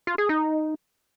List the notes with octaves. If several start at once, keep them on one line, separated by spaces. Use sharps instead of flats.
F4
G#4
D#4